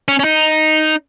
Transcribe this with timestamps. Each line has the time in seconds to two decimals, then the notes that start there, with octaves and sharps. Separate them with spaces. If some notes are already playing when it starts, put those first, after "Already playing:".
0.08 C#4
0.19 C#4
0.24 D#4